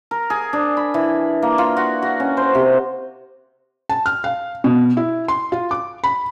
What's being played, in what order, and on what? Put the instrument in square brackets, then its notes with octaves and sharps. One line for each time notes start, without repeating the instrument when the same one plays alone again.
[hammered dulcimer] A#4
G#4
D4
B5
E3
A#3
F4
F#4
F#4
C#4
C5
C3
[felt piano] A5
F6
F5
B2
E4
C6
F4
D6
B5